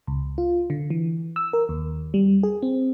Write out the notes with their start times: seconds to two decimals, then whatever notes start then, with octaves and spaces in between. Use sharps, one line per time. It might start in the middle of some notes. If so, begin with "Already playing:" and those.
0.07 C#2
0.38 F4
0.70 D3
0.90 E3
1.36 E6
1.53 A#4
1.69 D#2
2.14 G3
2.43 G#4
2.62 C4